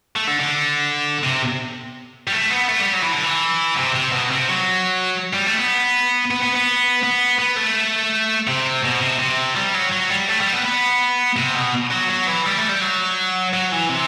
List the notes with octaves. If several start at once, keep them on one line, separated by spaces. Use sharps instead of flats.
A3
D3
D3
C3
G3
A3
B3
A3
G3
F#3
E3
D3
E3
C3
C3
B2
C3
F#3
G3
A3
B3
B3
B3
B3
B3
B3
A3
C3
B2
C3
C3
G3
F#3
F#3
G3
A3
G3
B3
B3
C3
B2
F#3
F#3
E3
G3
A3
G3
F#3
F#3
E3
C3